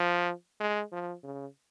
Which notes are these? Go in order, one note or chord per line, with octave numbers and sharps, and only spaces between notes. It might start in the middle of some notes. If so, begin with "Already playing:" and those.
Already playing: F3
G#3
F3
C#3